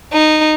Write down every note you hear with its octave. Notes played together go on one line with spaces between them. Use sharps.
D#4